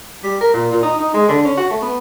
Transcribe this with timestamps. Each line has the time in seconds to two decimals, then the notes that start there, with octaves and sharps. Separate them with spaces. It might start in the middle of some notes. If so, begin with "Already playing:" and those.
0.23 G3
0.41 A#4
0.54 A#2
0.71 A#2
0.83 D#4
0.98 D#4
1.14 G#3
1.29 D3
1.45 C#4
1.57 F#4
1.70 A3
1.82 B3